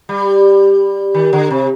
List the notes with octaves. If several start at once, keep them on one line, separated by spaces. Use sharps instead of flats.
G3
D#3
D3
C3